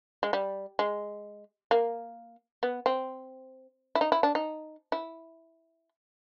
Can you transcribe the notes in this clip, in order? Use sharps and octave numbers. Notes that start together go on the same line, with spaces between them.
G#3
G3
G#3
A#3
B3
C4
E4
D#4
E4
D4
D#4
E4